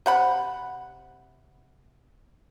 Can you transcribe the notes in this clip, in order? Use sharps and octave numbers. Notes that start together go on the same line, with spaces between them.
C3 F#5 B5